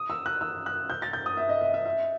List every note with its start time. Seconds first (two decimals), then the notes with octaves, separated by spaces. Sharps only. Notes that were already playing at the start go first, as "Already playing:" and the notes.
Already playing: D#6
0.10 E6
0.26 F#6
0.41 E6
0.66 F#6
0.90 G6
1.02 A6
1.13 G6
1.26 D#6
1.37 E5
1.49 D#5
1.61 E5
1.74 E5
1.86 E5